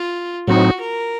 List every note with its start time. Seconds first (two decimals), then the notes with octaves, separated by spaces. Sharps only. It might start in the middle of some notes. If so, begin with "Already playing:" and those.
Already playing: F4
0.48 A2 F#3 C4 D#4 F#4
0.80 A#4